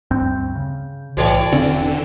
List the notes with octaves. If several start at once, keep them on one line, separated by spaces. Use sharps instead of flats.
D2 G2 C4 G6
C#3
B1 A2 E3 F#4 A4 C#5 D5 G5
E1 D3 C4 C#4